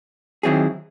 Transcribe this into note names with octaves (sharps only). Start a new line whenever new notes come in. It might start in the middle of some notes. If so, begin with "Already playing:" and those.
D#3 F#3 C4 E4 G#4